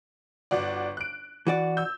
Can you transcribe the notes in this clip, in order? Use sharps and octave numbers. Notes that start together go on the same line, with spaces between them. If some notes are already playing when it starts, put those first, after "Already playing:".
G1 F#4 D5
F#6 D7
E3 F#4 D5
E6 G6